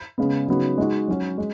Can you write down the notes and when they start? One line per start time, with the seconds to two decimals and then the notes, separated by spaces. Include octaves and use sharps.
0.18 C#3 G#3 B3
0.48 C#3 F#3 B3 D#4 F#4
0.78 G#3 D#4 F#4
1.08 F#3 C#4 F#4
1.38 G#3